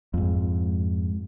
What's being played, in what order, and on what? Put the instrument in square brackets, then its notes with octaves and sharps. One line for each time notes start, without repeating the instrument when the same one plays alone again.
[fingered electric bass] F2 G#2